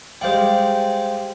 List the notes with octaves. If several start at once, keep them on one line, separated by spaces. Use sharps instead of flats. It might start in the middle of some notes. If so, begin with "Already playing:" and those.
G3 G#3 C5 F5 G5